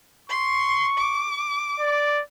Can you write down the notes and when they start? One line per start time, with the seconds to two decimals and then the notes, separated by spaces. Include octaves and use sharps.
0.30 C6 C#6
0.98 D6
1.80 D5